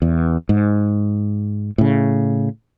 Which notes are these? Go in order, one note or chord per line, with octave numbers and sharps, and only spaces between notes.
E2
G#2
A2 C#3